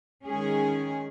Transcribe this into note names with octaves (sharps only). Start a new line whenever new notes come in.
D#3 G#3 C#4 G#4